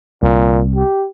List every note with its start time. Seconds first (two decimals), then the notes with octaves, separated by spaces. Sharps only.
0.22 C2 A#2
0.76 G4